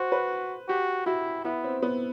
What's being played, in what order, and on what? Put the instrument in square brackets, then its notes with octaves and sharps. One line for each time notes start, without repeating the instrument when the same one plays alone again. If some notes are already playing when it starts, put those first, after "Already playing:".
Already playing: [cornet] F#4 [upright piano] C5
[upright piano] B4
[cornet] F#4 [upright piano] G4
[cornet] E4 [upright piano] F#4
[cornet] B3 [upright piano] E4
[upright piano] C4
B3